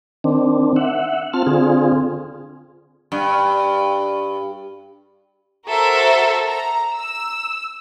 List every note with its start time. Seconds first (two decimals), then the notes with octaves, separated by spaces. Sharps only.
0.24 D#3 C4 D4
0.76 E5 F#5
1.33 C4 F4 A5 F6
1.47 D3 C4 F4 G#4
3.12 G2
5.68 F#4 A4 A#4 C5 E5
6.46 A#5
6.95 E6